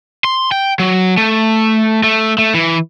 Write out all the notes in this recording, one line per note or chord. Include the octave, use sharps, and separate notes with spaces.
C6
G5
F#3
A3
A3
A3
E3